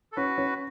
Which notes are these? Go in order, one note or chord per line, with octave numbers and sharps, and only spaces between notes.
A4
C#4 F#4 B4
C#4